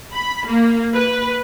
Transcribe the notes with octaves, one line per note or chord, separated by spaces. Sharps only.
B5
A#3
B4